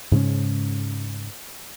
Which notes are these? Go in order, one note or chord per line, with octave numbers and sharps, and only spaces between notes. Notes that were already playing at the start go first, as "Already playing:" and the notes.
G#2 C#3 G#3 C#4